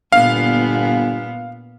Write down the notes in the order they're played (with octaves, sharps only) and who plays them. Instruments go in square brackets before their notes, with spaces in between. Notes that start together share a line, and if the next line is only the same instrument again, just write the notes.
[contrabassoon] G1 [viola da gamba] A#2 B3 [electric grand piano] F5